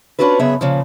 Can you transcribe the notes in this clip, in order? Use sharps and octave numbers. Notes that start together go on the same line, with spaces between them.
C#4 D4 F4 F#4 A4 B4
F#2 C#3 B3 G#4 E5
A#2 C#3 F3